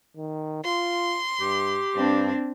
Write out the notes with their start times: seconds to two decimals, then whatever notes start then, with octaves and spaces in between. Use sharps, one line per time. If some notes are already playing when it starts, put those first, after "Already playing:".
0.16 D#3
0.65 F4 C6
1.40 G2 G4
1.96 G2 C4 D4